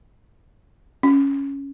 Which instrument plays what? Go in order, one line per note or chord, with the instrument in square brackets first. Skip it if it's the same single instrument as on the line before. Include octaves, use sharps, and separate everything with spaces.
[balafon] C#4